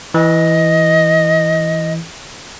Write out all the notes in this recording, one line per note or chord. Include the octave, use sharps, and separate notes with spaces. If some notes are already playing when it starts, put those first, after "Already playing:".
E3 D#5